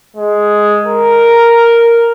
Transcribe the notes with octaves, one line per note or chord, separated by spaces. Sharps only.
G#3
A#4